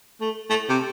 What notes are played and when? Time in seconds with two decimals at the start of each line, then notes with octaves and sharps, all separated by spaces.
0.21 A3
0.50 A3
0.69 C3